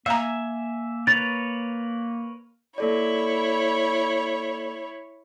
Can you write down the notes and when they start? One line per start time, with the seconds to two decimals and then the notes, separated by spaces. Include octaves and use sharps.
0.06 A#3 E5 F5 G#5 A#5
1.07 A#4 B4 C#5 A6
2.78 A#3 E4 A4 C#5 D5